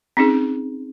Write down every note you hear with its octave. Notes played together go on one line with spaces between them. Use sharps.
C4 C#4 D#4 G#4